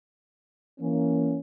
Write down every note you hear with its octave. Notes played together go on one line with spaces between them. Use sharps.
E3 A#3 C#4